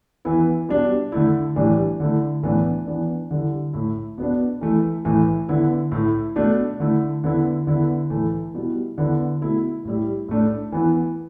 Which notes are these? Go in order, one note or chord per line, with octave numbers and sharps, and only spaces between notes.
E3 B3 E4
B2 G3 D4
D3 A3 E4
A2 E3 G3 D4
D3 A3 E4
A2 E3 B3 D4
E3 B3 D4
D3 G3 E4
A2 A3 E4
B2 B3 D4
E3 A3 E4
A2 E3 A3 E4
D3 B3 E4
A2 A3 E4
B2 A3 D4
D3 A3 E4
D3 B3 E4
D3 B3 E4
A2 E3 A3 E4
B2 G3 E4
D3 B3 E4
B2 A3 E4
A2 G3 E4
A2 A3 D4
E3 B3 E4